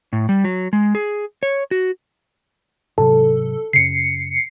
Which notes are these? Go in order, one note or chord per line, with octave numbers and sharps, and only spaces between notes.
A2
G3
F#3
G#3
G#4
C#5
F#4
G#2 C3 F#3 A4
F#2 C#3 C7 C#7